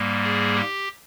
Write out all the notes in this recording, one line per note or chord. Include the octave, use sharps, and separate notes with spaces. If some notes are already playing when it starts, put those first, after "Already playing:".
Already playing: G#2 G3 A#3
G#4
G4